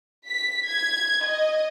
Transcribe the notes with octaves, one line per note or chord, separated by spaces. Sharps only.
B6
G#6
D#5